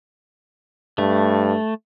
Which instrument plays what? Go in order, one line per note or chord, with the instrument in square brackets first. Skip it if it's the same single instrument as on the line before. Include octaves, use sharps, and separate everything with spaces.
[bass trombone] G2 [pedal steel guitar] A3